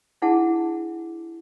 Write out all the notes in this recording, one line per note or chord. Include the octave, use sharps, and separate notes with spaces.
D4 E4 G#4 F#5 A5